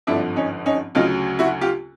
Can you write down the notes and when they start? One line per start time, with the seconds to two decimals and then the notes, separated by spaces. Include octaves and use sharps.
0.07 G#1 G2 D3 F3 D4 E4
0.36 C#4 D#4
0.66 C#4 D#4
0.95 D2 C#3 F#3 D#4 F4
1.39 E4 F#4
1.61 F4 G4